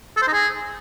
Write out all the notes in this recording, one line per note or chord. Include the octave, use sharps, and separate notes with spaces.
A4
C5
D#4
G#4